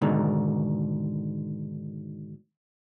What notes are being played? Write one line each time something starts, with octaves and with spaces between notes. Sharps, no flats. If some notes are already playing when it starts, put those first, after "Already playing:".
G#2 B2 D3 D#3